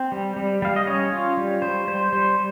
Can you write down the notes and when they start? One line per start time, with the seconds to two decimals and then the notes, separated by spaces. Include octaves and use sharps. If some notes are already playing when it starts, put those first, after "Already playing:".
Already playing: C4
0.12 G3
0.36 G3
0.62 G3 F5
0.76 D#5
0.87 C#4 C#5
1.12 F4
1.37 G3
1.62 G3 C5
1.88 G3 C5
2.13 G3 C5